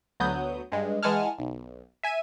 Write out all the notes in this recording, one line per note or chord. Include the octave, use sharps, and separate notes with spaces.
D2 F#3 B3 D#6 G6
G2 G#3
E3 G#3 F#5 G#5 A5 F6
B1
E5 G#5 G#6 D#7 E7